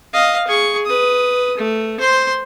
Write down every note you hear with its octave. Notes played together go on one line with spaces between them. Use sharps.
D#5 F5
G#4 C#6
B4 D#6
A3
C5 C6